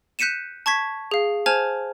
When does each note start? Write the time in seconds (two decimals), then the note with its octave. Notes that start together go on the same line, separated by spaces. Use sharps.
0.19 F#6 G6 B6 C#7 D#7 E7
0.66 A5 C#6 G#6 B6
1.11 G#4 F5
1.46 C5 G#5 A5 F6 G#6 F7